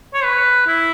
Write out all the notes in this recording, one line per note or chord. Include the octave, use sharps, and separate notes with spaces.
C#5
B4
E4